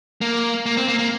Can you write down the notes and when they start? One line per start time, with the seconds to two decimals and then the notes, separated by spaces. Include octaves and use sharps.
0.21 A#3
0.66 A#3
0.77 C4
0.88 A#3
0.99 A#3